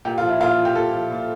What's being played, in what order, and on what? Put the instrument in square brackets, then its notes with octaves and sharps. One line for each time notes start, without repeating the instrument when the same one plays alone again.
[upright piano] A#2 G4
F4
F3
E4
A#2 F4
F3
G4
A#2 A4
F3
A#2